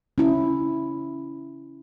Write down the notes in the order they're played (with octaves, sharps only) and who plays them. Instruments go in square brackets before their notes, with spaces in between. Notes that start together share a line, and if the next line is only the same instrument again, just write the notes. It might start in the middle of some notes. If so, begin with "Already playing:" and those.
[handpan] C#4 E4